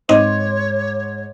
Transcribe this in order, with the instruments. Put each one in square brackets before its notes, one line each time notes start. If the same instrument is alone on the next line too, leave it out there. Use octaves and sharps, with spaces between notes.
[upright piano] G#2 C6 D6 [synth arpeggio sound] C4 D#4 D#5 [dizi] C#5